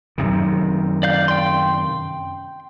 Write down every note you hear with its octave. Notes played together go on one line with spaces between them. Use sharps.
F#2 C3 D#3
D5 F5 G6
G5 C6